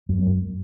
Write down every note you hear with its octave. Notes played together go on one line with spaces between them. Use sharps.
F#2